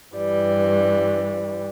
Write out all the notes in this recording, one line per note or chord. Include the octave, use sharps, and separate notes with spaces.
G2 E3 G3